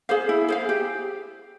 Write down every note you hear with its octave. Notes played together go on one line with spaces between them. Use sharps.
G#4 C5 F5
E4
G#4 C5 F5
G4